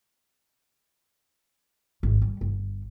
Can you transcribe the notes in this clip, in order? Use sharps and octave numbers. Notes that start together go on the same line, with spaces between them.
G#1
G3
G1